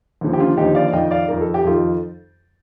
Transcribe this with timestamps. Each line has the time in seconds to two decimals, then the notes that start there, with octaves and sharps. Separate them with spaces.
0.21 D#2 D3 F3
0.33 G4
0.40 D4 F4
0.57 D#2 D3 F3 D#4 G4
0.75 D5 F5
0.88 F5
0.93 F2 D#3 D#5 G5
1.11 D5 F5
1.28 F2 D#3 A#4
1.41 A4
1.54 G4
1.64 F2 D#3 F4 A4